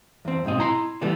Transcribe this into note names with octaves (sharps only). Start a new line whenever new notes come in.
E2 C4
B1 G#2 C4 D#5
E4 A#5 C6
C3 E3 G3 A3 B3